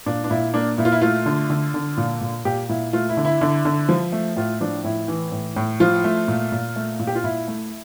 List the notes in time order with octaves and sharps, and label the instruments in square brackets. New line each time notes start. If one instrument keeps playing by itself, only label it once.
[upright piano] A#2 D4
D4
A#2 E4
A#3 D4
A#2 E4
F4
E4
A3 F4
D3
D3
D3
A#2
A#2
A#2 G4
A#2 E4
A3 F4
E4
D3
E4
D3
D3
F3
A3
A2 F4
F3 D4
A2 E4
E3
A2
A2
F3 F4
A3
A#2
A#2
A3
A#2
G4
F4
A#2 E4
A3